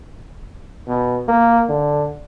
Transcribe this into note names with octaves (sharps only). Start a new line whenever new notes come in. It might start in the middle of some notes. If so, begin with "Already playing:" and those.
B2
A#3
D3